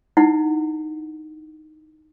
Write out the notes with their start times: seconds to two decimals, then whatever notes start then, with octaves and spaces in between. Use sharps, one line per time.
0.17 D#4 E4 F#5